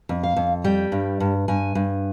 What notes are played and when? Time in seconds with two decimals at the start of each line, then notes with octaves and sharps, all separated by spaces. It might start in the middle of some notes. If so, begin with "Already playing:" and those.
0.09 F2
0.23 F5
0.36 F2
0.64 G3 G5
0.92 G2
1.20 G2
1.48 G2 G#5
1.75 G2